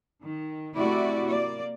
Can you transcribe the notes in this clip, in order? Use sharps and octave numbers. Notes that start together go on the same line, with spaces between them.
D#3
C3 A3 E4 F#4 D5
A#3 D5